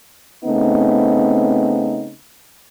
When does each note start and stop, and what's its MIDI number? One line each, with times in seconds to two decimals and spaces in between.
0.45 2.12 49
0.45 2.12 57
0.45 2.12 59
0.45 2.12 60
0.45 2.12 63